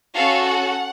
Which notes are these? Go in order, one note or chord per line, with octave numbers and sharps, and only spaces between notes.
C#4 F#4 A4 F5
F#5